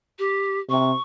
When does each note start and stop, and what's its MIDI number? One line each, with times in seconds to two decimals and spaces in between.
0.18 0.59 67
0.69 0.93 48
0.69 1.02 85